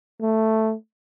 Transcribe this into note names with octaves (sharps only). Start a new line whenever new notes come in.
A3